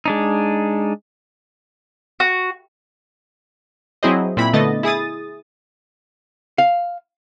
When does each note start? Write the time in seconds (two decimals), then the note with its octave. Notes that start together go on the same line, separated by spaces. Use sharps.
0.06 G#3 D4 D#4
2.20 F#4
4.03 F#3 C4 E4 G#4 C5 D#5
4.37 A#2 C4 E4 B5
4.53 D3 A3 B3 D#5 A6
4.83 E4 G#4 D#6 A6
6.58 F5